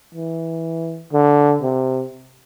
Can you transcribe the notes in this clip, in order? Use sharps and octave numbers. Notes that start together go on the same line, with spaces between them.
E3
D3
C3